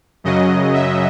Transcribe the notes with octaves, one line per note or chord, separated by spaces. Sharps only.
F#2 C#3 F#3 D#5
E5